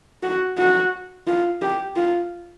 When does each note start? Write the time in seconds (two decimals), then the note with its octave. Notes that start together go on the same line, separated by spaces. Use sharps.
0.23 F#4
0.58 F#4
1.27 F4
1.62 G4
1.96 F4